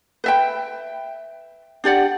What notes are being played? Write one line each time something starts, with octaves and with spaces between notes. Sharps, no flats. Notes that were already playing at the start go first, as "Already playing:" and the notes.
B4 E5 G5
D4 G4 D5 F#5